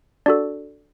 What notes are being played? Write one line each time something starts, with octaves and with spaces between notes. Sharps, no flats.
D4 F#4 A4 D5